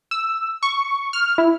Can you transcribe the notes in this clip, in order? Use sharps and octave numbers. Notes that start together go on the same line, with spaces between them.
E6
C#6
F6
E4